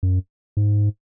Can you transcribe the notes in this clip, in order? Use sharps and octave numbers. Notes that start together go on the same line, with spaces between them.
F#2
G#2